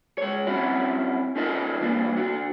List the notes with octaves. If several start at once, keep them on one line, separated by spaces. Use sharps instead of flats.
G#3 C#5
F#3 C4 C#4 E4 F#4
C#4 D#4 F4 A4 A#4 D#5
E3 G3 A#3 D4
D3 F#4